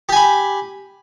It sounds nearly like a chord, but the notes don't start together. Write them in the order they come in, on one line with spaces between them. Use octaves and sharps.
G4 G#5 B5